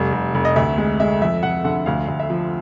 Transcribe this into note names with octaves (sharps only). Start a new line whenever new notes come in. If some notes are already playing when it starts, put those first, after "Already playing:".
Already playing: F1 G3
F1
F1
D#5
D2 E5
G#3
G#3 E5
F2 E5
F2 F#5
D3 F#5
D2 F5
D2
E5
F3